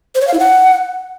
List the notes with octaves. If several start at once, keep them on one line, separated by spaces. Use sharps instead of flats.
C5
C#5
F5
E4
F#5